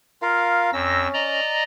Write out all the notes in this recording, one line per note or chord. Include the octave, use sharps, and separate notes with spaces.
F4 A#4 F5
F2 C#4 E6 A#6
D5 D#5 A#5